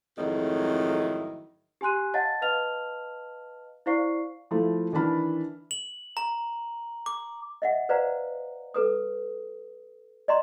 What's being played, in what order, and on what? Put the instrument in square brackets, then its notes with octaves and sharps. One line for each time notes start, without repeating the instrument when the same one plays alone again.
[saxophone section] F2 G#2 D#3 F#3 A3 E4
[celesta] G4 G#5 C6 F#6 D#7
C#5 D#5 F5 F#5 A5 A6
B4 D#5 F5 A5 F6 F7
E4 C5 D5 F5 C#6 C7
[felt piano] F3 A3 E4
D#3 E3 D4 A5 B5 F6
[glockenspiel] F#7
A#5
D6
[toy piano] D#5 E5 F#5
B4 C5 D5 F5 F#5 A#5
A4 B4 D#6
D5 D#5 A#5 C6